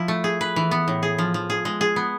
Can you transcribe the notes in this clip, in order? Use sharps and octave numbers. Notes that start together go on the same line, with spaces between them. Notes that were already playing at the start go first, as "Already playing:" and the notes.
Already playing: F3 E4
A3
G#4
B4
E3
B3
A2
G#4
F3
F3
G#4
G#3
G#4
B3